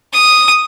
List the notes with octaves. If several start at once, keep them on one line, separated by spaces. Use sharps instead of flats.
D#6